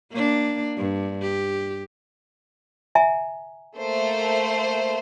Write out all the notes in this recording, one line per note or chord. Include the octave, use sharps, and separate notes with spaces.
A#3 D4
G2
G4
E5 G#5 A#5
A3 A#3 C5